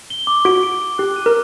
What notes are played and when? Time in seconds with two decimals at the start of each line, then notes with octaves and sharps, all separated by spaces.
0.10 G7
0.27 D6
0.45 F#4 D7
0.63 D7
0.81 D7
0.98 G4 F#6
1.16 D#7
1.26 A#4